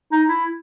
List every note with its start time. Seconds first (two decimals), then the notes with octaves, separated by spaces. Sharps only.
0.12 D#4
0.29 E4